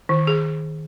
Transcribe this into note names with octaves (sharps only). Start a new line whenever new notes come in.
D#3
G#4